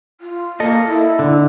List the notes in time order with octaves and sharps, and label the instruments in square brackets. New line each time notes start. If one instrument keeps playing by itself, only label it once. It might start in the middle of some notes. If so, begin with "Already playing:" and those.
[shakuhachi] F4
[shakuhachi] A#3 [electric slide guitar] A4 D#5
[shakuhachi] E4
[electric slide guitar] D3